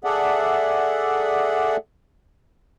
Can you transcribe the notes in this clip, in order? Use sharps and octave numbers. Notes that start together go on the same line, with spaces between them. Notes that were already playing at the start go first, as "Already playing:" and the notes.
G#4 A4 D5 E5 F#5